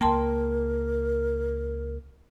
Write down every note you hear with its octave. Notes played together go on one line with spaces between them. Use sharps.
C#2 A#3 A#4 G5 A5 C6